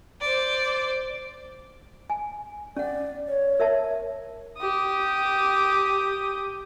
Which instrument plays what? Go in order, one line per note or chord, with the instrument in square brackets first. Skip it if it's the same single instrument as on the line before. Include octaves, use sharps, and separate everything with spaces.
[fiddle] C5 D5
[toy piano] G#5
[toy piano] C#4 F#5 [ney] D5
[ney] C#5
[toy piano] A#4 E5 A5
[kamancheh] G4 D#6